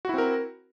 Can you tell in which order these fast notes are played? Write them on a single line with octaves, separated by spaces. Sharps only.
F#4 E4 C4 A#4